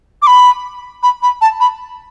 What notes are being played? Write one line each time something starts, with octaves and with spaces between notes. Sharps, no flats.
D6
B5
B5
B5
A5
B5